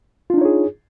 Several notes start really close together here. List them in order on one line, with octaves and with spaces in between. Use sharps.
F4 D4 D#4 C#5 G#4